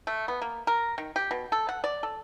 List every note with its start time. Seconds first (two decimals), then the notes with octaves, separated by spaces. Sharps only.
0.07 A3
0.28 B3
0.42 A#3
0.67 A#4
0.98 D#3
1.16 G4
1.31 B2
1.52 A4
1.69 F#5
1.84 D5
2.03 A4